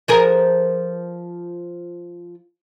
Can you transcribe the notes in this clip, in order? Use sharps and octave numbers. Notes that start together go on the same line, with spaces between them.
F3 G#4 A#4